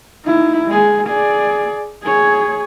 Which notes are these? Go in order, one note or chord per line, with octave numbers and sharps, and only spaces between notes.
D#4 E4
G#3 G#4
G#4 D5
G#4 C#5